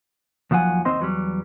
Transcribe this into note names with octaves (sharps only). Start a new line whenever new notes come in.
D#2 F3 F#3 F#5 G#5
D#2 C4 C5 D#5 C6
E2 F#3 G3